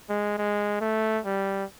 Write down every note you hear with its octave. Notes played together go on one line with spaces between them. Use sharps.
G#3
G#3
A3
G3